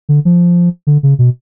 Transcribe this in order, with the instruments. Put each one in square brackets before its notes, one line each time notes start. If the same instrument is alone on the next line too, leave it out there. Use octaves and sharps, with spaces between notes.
[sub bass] D3
F3
D3
C#3
B2